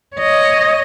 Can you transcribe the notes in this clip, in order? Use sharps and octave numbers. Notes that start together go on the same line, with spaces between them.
C#5 D#5